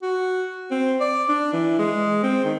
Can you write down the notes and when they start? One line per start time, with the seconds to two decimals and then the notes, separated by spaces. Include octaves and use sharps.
0.03 F#4
0.71 C4
1.01 D5
1.29 D4
1.53 E3
1.79 G#3
2.23 C4
2.45 D#3